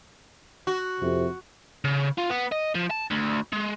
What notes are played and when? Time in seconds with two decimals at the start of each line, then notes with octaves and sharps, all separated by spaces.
0.67 F#4
1.01 F2 C3
1.85 C#3
2.18 F4
2.30 B3
2.52 D#5
2.75 F3
2.91 A5
3.11 D2
3.53 G#3